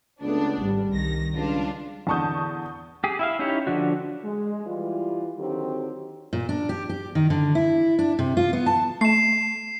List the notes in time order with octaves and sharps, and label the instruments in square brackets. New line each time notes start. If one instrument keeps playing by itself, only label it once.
[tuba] C#2 [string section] A3 B3 D4
[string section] G#1 [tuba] G3
[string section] C2 D#3 A#6
[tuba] C#2 [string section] G3 D4 F4
[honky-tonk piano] E2 D3 A5 C#6 D#6 G6
[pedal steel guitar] G4 G#4
E4 E5 F5
C#4 D#4 E4 G4 C#5
D3 F3 D4 F#4
[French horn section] G#3
E3 G3 F4
D3 D#3 F#3 C4 G4
[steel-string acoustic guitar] A#2
D4
G4
G4
D#3
D3
E4
D4
C3
F4
B3
A5
[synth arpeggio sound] A3 [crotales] C7 E7